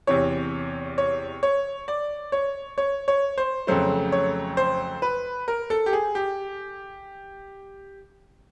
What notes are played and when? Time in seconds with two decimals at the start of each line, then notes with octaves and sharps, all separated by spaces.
0.07 E2 C3 E3 C#5
0.98 C#5
1.43 C#5
1.88 D5
2.32 C#5
2.78 C#5
3.08 C#5
3.38 C5
3.67 F2 C#3 F#3 A3 C5
4.12 C#5
4.57 C5
5.02 B4
5.48 A#4
5.70 A4
5.86 G4
5.93 G#4
6.15 G4